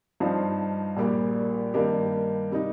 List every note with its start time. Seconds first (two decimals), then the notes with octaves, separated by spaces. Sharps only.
0.20 G2 F3 D#4 C5 F5
0.97 A#1 A#2 G3 A#3 G4
1.74 G2 D#3 A#3 G4
2.52 C3 G3 D#4